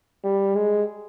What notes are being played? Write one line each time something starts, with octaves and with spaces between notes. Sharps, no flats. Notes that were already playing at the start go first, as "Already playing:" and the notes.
G3
G#3